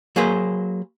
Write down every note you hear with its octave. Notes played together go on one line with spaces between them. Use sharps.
F#3 A#3 G#4 B4 C5